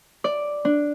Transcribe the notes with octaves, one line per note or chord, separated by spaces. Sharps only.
D5
D4